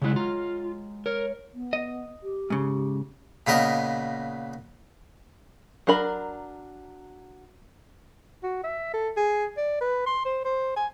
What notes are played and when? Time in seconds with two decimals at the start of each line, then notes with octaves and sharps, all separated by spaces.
0.02 C#3 F#3 G#3 E4 F#6
0.16 F4 A#5 F6
1.06 A#4 C#5
1.54 B3
1.73 D#5
2.23 G4
2.50 G#2 C#3
3.47 A#2 C#3 B3 A#4 D#5
5.87 F#3 D4 A#4 B5
8.43 F#4
8.64 E5
8.94 A4
9.17 G#4
9.57 D5
9.81 B4
10.07 C6
10.25 C5
10.45 C5
10.77 G#5